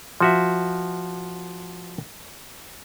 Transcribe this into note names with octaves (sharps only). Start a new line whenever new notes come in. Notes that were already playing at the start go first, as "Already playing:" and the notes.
F3 F#4 E5